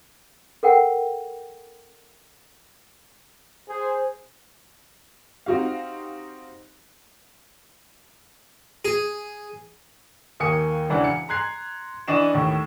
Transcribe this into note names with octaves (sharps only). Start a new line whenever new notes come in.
A4 A#4 F#5 G5
G#4 C5
C4 D#4 F#4 G4 F5
G#4
D#2 A#3 G#5 D#6 C#7
E1 C#3 E3 D4 F#5
C#7
A#5 C6 F#6 G#6 C7
E3 D4 D#5 C#6 E7
D#2 A2